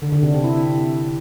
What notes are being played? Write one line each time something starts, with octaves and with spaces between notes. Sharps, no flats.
D3
D3
C3
C4
E4